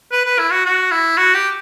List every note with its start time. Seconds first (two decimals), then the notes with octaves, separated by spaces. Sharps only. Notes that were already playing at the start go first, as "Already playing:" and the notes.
0.12 B4
0.25 B4
0.39 E4
0.51 F#4
0.65 F#4
0.91 E4
1.17 F#4
1.34 G4